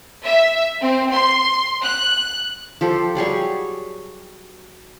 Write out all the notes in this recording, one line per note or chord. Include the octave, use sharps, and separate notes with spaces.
E5
C4
C6
F#6
F3 G4 A4
F#3 G3 G#4 C#5